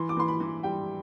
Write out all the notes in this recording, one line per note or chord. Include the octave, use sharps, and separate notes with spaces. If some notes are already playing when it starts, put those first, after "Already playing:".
Already playing: E3 C6
D6
E3 C6
B5
E3
G3 G5